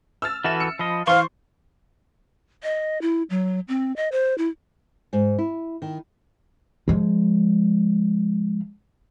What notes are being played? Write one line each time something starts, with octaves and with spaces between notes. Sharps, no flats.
E6 F6 A6
E3 F#4 A4 E5 E7
E6 C#7
F3 D#5 B5
E3 C5 F5 C6 C#6
D#5
E4
F#3
C4
D#5
C5
E4
G#2
E4
D#3
F3 G#3